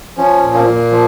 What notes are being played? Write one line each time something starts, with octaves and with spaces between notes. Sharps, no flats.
F3 C#4
A#2
A#3
A#2
F3